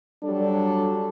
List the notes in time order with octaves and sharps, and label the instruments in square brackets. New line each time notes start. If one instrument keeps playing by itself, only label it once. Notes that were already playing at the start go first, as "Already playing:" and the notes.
[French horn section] F#3 G3 D4 A4